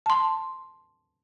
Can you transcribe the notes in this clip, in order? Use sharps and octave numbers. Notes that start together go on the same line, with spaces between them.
A5 C6